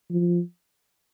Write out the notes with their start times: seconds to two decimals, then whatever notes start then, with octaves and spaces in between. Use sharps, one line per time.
0.10 F3